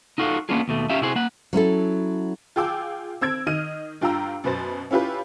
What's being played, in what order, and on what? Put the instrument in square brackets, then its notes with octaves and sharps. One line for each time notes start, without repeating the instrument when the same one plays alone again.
[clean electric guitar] D#4 F4 F#4 A4 F5
A#3 B3 C#4 D4 F4 G#4
D#2 B2 A3
C#4 F4 G4 A#4 E5 F5
C3 E4 F#4 G#4 C5
A#3 F#5
[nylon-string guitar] F#3 C#4 E4 A4
[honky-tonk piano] F4 G#4 G5 D6 E6
C4 E6 G#6 D7
D#3 D#5 F6 D#7
G2 F4 G5 A#5 E6
F#2 B2 B4 C5 A6
C#4 E4 F4 G4 B4